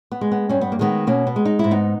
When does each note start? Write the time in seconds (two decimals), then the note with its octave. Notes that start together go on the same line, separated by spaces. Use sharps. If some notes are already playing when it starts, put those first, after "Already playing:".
0.12 B3
0.21 G#3
0.32 B3
0.49 G2 C#4
0.61 B3
0.72 A#3
0.79 D#3 G#3 B3
1.07 B2 A#3 C#4
1.27 B3
1.36 G#3
1.45 D#4
1.59 G#2 E4
1.71 B3 D#4